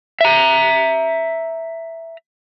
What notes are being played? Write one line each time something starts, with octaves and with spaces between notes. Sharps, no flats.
E5 A#5